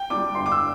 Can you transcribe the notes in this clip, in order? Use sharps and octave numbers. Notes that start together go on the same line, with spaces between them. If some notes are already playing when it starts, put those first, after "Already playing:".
Already playing: G5
G3 D4 D6
G1 C6
D6
E6